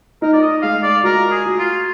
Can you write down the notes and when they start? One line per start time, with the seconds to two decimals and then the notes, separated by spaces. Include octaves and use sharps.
0.22 D#4 A#4
0.33 D5
0.42 D#5
0.62 G#3 F5
0.83 D5
1.03 F#4 A#4
1.31 G#4
1.46 F#4
1.59 F4